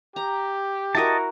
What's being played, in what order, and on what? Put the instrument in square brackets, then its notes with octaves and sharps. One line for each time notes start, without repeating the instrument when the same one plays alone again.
[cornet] G4 [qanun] A#5
[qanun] E4 F#4 A#4 [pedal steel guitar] D#5 A5